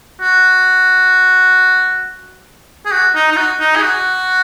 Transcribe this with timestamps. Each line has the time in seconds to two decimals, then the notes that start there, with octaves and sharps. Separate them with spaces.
0.21 F#4
2.85 G#4
2.92 F#4
3.15 D#4
3.31 D#4
3.37 F#4
3.60 D#4
3.76 G#4
3.82 F#4